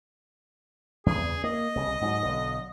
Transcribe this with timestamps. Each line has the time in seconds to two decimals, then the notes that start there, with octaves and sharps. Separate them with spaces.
1.06 E2 C#3 G#4
1.44 A#3 D#5
1.76 C2 C#3
2.01 G#2 F#3
2.23 B1 D3